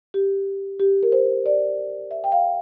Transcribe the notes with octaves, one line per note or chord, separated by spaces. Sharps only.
G4
G4
A#4
C5
D5
E5
G5
F5